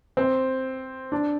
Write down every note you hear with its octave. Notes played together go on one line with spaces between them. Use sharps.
C4
D4